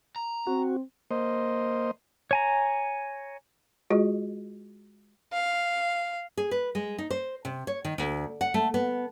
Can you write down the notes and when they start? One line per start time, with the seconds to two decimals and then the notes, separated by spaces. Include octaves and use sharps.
0.16 A#5
0.47 C4 F#4
1.11 A#3 C5 D#5
2.31 C#5 G#5 A#5
3.90 G#3 F4 F#4 G#4 D#5
5.33 F5
6.37 G#4
6.51 B4
6.75 G#3
6.98 D#4
7.10 C5
7.45 C3
7.67 C#5
7.85 D#3
7.98 D2
8.41 F#5
8.54 A3
8.74 B3